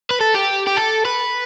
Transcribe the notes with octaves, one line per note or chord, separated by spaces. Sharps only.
B4
A4
G4
G4
A4
B4